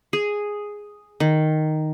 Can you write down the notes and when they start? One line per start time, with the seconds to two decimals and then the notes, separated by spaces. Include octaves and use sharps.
0.13 G#4
1.20 D#3